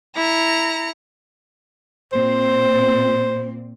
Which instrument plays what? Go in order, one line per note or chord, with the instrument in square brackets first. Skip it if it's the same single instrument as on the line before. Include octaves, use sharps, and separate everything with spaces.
[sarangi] E4 [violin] A#5 C#7
[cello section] A#2 C4 [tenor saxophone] C5